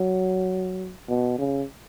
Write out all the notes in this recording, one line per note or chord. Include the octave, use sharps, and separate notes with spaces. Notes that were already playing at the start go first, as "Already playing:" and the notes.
Already playing: F#3
B2
C#3